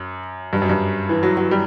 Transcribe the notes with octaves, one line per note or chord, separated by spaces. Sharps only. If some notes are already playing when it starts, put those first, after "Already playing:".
Already playing: F#2
G2
F#2
G2
E3
F#3
F#3
G3